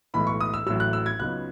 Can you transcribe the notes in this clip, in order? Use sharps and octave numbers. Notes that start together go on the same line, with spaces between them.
B1 A2 E3 G#3 B5
C#6
D#6
E6
A1 A2 F#3 E6
F#6
E6
G#6
C#2 C#3 F#3 B3 D#4 F#6